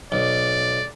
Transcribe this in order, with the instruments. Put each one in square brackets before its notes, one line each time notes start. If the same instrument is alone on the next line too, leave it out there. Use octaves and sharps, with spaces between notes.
[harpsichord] B1 [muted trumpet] D5